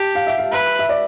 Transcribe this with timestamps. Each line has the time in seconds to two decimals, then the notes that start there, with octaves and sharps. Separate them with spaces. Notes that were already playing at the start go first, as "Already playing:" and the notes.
Already playing: G4 A5
0.15 F5
0.27 E5
0.38 F5
0.52 B4 E5
0.79 E5
0.89 D5